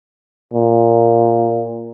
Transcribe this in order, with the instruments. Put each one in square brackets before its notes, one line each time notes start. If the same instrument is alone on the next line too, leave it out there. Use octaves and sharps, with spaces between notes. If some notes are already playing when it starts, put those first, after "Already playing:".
[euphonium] A#2